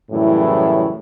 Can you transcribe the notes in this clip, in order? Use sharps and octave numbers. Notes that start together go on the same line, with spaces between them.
F#2 A2 C#3 E3 G3 E4